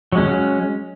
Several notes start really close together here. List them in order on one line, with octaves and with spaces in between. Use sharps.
F#3 G#3 C#4